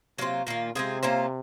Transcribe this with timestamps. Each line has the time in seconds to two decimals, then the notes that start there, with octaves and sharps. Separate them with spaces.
0.18 C3 F#3 A#3 F4 C5
0.47 A#2 D#3 A#3 F4
0.75 C3 G#3 C4 F4 G#4
1.03 A#3 C#4 F4 C5